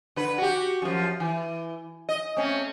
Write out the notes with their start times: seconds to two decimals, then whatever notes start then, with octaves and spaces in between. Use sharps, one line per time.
0.16 D3 B4
0.38 F#4 G4
0.82 F#2 F3
1.20 E3
2.09 D#5
2.36 A3 C4 C#4